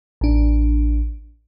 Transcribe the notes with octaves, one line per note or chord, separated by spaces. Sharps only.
A1 D4